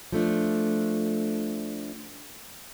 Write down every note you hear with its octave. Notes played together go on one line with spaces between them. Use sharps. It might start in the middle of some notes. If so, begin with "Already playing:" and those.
F3 A3 D4